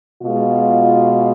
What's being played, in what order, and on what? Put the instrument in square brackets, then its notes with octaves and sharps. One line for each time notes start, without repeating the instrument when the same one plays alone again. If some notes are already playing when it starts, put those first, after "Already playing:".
[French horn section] B2 G#3 F4